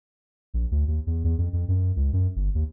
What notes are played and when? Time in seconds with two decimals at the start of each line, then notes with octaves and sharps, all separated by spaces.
0.54 A#1
0.71 D2
0.88 D#2
1.07 E2
1.24 E2
1.38 F2
1.53 F2
1.68 F#2
1.96 C#2
2.13 F#2
2.36 G1
2.55 D#2